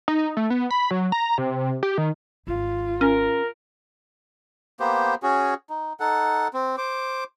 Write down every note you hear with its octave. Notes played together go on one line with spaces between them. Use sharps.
D#4
A3
B3
B5
F#3
A#5
C3
G4
D#3
G#1 F4
C#4 A#4
A#3 B3 G4 C5
C#4 F#4 G#4
D#4
D#4 A4 F#5
C4
C5 D6